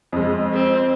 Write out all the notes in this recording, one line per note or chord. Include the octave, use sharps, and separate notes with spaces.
F2 G#3
C4